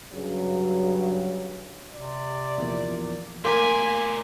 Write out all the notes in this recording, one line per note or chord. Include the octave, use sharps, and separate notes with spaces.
G2 C#3 F#3
C3 D5
A#1 E2 A#2
A2 A#3 A#4 G#5 C6 D6 B6